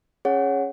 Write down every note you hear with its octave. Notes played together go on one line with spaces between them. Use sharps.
C#4 G#4 C#5 F#5